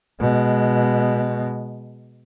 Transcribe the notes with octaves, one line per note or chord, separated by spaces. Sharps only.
B2 G#3